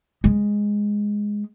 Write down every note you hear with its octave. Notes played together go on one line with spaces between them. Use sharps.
G#3